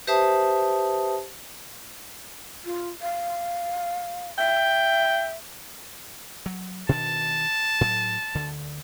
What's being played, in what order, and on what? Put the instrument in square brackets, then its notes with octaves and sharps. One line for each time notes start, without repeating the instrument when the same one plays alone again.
[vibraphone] G4 B4 C5 E5 A5 D#6
[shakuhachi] F4
F5
[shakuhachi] E5 [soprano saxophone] G5
[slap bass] F#3
[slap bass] B2 D#3 D4 [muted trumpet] A5
[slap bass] A2 F#3
D2 D3